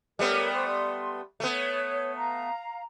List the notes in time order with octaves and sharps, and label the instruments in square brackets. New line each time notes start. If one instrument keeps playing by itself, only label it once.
[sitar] G3 A3 B3 [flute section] A#4 C#5
[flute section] C5 D5 C#6
C6
[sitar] A3 B3 [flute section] C#5
[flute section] F5 A#5